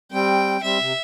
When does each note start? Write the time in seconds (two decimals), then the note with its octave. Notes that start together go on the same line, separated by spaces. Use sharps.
0.12 G3 C4 G5
0.63 G3 C4 E5
0.80 C3